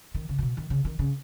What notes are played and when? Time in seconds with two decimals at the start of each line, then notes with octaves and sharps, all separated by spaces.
0.14 D#3
0.29 C#3
0.38 A#2
0.42 B2
0.57 D#3
0.70 C#3
0.85 D#3
0.99 C#3